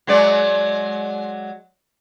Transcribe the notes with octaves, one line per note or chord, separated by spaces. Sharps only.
F#3 G#3 D5